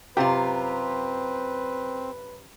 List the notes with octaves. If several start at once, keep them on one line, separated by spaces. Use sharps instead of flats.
F#2 C3 C4 F4 G4 B4 F5 G5